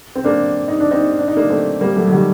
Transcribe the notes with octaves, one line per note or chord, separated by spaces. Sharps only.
C4
A#3 D4
D#4
D4
C4 D#4
D4
D#4
A#3 D4
A3 C4
G3 A#3
F#3 A3
F#3
D#3 G3